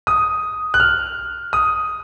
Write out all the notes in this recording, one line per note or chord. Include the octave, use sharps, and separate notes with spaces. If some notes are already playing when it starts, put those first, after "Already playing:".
D#6
F#6
F6
D#6